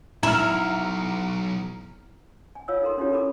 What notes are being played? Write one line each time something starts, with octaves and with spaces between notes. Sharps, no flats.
B1 G#2 E4 A#5 F6
G#5
F4 C#5 F5 E6
D#4 A4 A#4 C6
C#4 D4 E4 F4 G4 C#5
A4 A#4 B5 D6